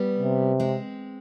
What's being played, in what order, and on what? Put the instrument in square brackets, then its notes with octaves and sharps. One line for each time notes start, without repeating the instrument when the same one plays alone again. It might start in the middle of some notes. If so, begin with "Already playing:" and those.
Already playing: [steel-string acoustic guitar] G3 B3
[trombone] C3
[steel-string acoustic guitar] G#3 C4